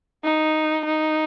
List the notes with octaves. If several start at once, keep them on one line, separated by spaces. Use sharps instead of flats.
D#4
D#4